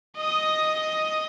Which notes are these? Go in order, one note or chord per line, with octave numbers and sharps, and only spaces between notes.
D#5 D#6